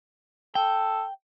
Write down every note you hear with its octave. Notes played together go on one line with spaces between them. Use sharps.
A4 G5